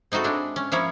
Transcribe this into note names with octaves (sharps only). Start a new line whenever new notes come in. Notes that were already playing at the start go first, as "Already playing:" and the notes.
C4 D#4 E4 F#4 A4
F#3 G#3 D4 E4
C#4
F3 A#3 E4 C#5